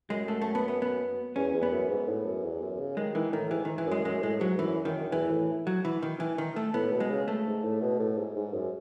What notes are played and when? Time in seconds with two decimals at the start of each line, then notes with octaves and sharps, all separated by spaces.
0.10 F#2 G#3
0.28 A3
0.42 A3
0.55 B3
0.68 B3
0.82 B3
1.36 E2 C#4
1.54 E2
1.63 B3
1.71 F#2
1.89 G#2
2.08 A2
2.26 F#2
2.44 E2
2.61 F#2
2.79 C#3
2.97 D#3 G#3
3.15 D#3 E3
3.33 A2 D#3
3.51 G#2 E3
3.65 D#3
3.78 E3
3.86 F#2
3.92 G#3
4.05 F#2 G#3
4.23 A2 G#3
4.40 G#2 F#3
4.59 F#2 E3
4.85 F#2 D#3
5.12 E2 E3
5.30 A2
5.67 F#3
5.85 E3
6.02 D#3
6.20 E3
6.38 D#3
6.56 A3
6.74 A2 B3
6.92 B2
7.00 G#3
7.10 C#3
7.28 A3
7.46 G#2
7.64 A2
7.81 B2
7.99 A2
8.18 G#2
8.36 G#2
8.53 F#2